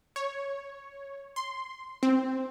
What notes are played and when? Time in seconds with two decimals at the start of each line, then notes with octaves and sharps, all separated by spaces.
0.16 C#5
1.36 C6
2.03 C4